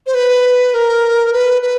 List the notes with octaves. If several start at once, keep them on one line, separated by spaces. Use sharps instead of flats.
C5
B4
A#4
B4
B4